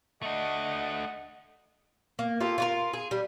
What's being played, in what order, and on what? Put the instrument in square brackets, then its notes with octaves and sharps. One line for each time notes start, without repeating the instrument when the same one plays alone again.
[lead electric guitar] A3 D4 [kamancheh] D#5 F#5
[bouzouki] A#3
F4 G4 A4 A#4
F4 F#4 A#4
G#4
G3